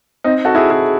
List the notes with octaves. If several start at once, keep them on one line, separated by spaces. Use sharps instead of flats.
C4 D#4
F#4 A4
E4 G#4
E4 G#4